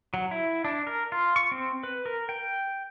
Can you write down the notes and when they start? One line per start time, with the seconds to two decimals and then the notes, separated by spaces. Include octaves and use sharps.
0.14 F#3
0.31 E4
0.65 D4
0.87 A#4
1.12 F4
1.36 C#6
1.52 C4
1.83 B4
2.06 A#4
2.29 G5